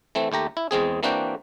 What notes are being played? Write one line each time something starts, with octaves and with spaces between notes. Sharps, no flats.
E3 A3 C4
D#2 A3 G4 A#5
E4
E2 G#3 C4 G#4
E3 A#3 C4 D4 F#4 G5